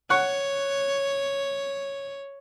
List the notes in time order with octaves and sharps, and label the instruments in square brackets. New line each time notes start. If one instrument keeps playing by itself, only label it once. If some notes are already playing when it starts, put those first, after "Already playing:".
[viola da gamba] C#5 [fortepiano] F#5 C#6